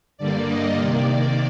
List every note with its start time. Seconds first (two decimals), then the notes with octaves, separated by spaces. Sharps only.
0.18 G2 D3 G3 A#3 D5
0.47 D#5
0.76 C3 D#3 A#3 D5